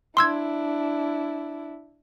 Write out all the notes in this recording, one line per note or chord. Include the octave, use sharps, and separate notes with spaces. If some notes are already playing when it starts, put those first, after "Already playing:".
D4 E4 C6 E6 G#6